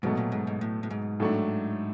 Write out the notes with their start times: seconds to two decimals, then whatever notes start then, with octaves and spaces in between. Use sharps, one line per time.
0.03 G#2 B2 F#3 A3
0.17 A#2
0.32 G#2
0.47 G#2
0.61 A2
0.83 A2
0.90 G#2
1.20 A2 F#3 A3 D4